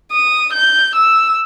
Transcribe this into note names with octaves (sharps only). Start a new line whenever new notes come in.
D#6
G6
E6